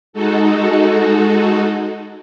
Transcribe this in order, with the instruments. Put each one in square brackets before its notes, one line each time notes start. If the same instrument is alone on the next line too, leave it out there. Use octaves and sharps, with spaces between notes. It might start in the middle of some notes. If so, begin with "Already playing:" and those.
[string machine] G#3 D#4 F#4 A4